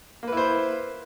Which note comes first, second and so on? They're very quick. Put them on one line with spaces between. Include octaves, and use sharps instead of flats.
A#3 B4 E4 C5